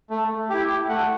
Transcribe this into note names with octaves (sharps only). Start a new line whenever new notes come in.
A3
E4 G4
A3 F#5